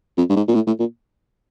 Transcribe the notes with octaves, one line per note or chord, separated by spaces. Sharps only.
F2
G2
G#2
A#2
A2
A2
A#2